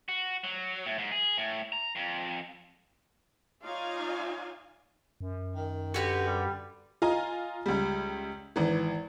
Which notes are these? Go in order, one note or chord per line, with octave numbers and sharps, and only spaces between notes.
F#4
F#3
A2
G#2
G#4
A2
A#5
F2
D#4 F4 C#5 D5 F5 G#5
F#2
D#3
D3 F#4 G4 B4
G3
F4 D#5 G#5 A#5
C#2 G3
G#1 E3